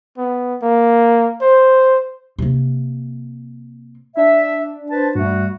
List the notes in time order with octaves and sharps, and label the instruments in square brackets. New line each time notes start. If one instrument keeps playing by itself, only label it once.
[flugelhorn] B3
A#3
C5
[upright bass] C3 A#3
[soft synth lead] D4 [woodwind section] E5
[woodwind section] B4 C5 A5
[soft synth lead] G2 [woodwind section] G3 A3 F#4